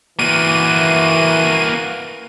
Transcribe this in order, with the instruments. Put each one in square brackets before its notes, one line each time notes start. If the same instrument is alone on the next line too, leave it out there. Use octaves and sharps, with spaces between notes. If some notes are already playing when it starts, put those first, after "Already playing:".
[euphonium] E3 [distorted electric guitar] A#3 F#4 [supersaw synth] D#7